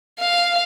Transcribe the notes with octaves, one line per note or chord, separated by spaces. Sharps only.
F5